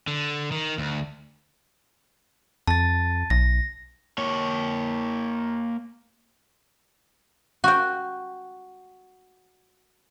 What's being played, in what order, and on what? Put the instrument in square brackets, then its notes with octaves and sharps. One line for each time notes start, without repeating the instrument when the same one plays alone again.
[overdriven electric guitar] D3
D#3
D2
[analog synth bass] F2 [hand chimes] A5 A6
[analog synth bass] B1 [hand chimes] A#6
[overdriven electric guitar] A#3 C#5
[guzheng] F#4 G5